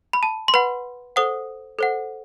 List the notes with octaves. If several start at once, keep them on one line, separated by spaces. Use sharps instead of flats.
B5
A5
C6
B4 F#5 B5
A4 C5 F#5 D#6
A4 C5 F#5